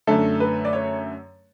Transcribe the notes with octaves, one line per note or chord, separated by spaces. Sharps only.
F#2 D3 A3 A4
B4
D5
C#5